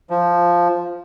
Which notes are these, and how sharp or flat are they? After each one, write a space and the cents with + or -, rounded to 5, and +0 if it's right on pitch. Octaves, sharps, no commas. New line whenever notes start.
F3 -5